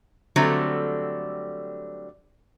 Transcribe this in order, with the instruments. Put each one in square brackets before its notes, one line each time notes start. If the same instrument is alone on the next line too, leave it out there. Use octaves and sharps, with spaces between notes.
[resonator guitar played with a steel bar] D3 F#3 G3 A3 C4